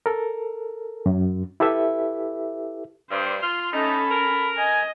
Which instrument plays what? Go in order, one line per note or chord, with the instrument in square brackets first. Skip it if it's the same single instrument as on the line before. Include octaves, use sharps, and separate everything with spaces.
[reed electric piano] A4 A#4
F#2
E4 G4 A4 B4 E5
[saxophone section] G2 [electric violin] C5
[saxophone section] F4 [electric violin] C6
[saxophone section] A3 D#4 [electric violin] C#4 A4 [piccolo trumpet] B5
[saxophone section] A#4
[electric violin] D#5 [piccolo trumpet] G#5